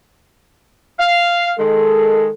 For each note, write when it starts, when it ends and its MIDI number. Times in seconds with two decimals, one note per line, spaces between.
0.98 1.52 77
1.59 2.29 51
1.59 2.29 56
1.59 2.33 69